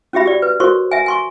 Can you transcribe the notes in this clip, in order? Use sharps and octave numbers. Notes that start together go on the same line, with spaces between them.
C#4 F#4 G4 E5 B5
G4 D5
B4
F#4 A#4 C5 C6 C#6
E5 G#5
G#5 C6 C#6